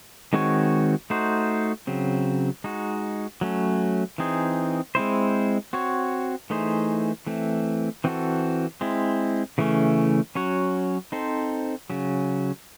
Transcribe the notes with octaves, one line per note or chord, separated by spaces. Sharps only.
D#3 G#3 C4 F#4 C#5
A3 D#4 F#4 C5
C#3 F#3 C4
G#3 D#4 F#4
F#3 A3 C#4
E3 C4 D#4 G#4
G#3 C4 E4 C5
C4 F#4 C#5
E3 A3 D#4 G#4 C5
E3 A3 C4
E3 C4 F#4 A4
G#3 C4 E4
C#3 E3 A3 C#4
F#3 C#4 F#4 C#5
C4 D#4 A4 C5
C#3 F#3 C#4